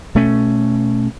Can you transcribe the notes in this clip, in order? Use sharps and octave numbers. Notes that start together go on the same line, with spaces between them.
B2 A3 C#4